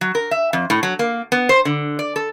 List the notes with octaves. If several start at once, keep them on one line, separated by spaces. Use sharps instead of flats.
F#3
A#4
E5
F2
A2
F#3
A#3
B3
C5
D3
D5
A4